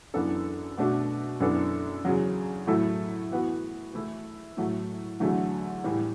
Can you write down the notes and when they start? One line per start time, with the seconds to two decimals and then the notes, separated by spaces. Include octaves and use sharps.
0.14 F#2 E3 B3 D4 A4
0.78 B2 A3 D4 F#4
1.40 F#2 E3 B3 D4 A4
2.05 E2 C#3 F#3
2.67 A2 F#3 A3 E4 A4
3.31 E3 B3 F#4
3.94 E3 A3 E4
4.57 A2 F#3 A3
5.20 E2 D3 F#3 A3
5.84 A2 E3 G3